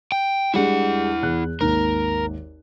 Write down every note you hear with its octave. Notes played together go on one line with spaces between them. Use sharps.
G5
G3 G#3 D4 E4 F#5
E2 F#6
G#1 D#2 A#4